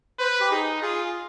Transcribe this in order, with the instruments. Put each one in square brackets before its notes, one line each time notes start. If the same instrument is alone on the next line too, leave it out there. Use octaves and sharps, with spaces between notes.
[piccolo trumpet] B4 [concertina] C5
[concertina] G4
[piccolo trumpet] D#4 [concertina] G#4
[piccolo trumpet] F4 [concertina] G#4